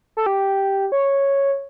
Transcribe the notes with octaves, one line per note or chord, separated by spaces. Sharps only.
A4
G4
C#5